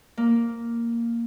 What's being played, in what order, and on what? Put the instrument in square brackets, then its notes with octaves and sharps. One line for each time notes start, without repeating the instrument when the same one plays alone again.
[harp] A#3